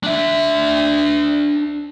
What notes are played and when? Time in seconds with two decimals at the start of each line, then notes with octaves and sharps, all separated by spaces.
0.03 D4 E5